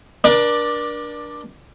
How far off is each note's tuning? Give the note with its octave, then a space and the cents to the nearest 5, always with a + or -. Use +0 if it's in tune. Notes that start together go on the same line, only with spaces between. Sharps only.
D4 +5 A#4 +40 D5 +15